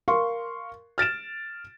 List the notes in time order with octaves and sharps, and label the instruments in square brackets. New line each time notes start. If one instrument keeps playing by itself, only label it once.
[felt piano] A#4 F5 C6 C#6
F6 A6 D7 E7